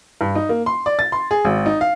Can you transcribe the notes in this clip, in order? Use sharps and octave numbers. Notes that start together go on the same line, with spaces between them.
G2
D#4
A#3
C6
D5
A6
C6
G#4
G#1
D#4
F5